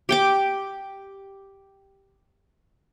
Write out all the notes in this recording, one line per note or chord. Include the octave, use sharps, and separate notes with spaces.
G4 G5 D6